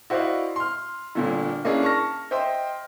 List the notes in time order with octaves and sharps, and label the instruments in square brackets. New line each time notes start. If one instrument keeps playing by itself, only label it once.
[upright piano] E4 F#4 C5 D5 D#5 F5
C6 F6
G1 A#2 D3
A#3 C#4 D4 E4 G#4
A5 C#6 F6 A#6
C5 D#5 E5 G5 C6